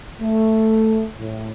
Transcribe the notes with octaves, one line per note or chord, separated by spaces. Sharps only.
A3
A2